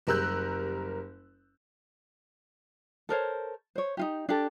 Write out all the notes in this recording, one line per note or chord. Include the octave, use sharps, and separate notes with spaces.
F#1 G3 A#4 E6 F#6 G6
A4 A#4 C5 C#5
C5 C#5
D#4 F4 G4
D4 G4 A4